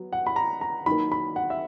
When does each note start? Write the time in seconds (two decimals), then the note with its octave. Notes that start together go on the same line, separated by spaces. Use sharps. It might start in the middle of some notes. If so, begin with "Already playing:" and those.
Already playing: F#3 B3
0.13 F#5
0.27 B5
0.36 A#5
0.61 A#5
0.86 D#3 F#3 A#3 B5
1.12 B5
1.36 F#5
1.50 E5